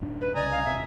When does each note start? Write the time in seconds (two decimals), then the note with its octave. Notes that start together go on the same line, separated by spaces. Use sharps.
0.01 D1 F#2 D4
0.21 B4
0.35 C2 C#3 D5 D#5 G#5 A#5
0.52 F5
0.65 D#1 C3 E5